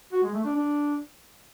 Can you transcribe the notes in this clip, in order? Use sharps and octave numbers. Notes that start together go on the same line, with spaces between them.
F#4
G#3
A3
D4
D4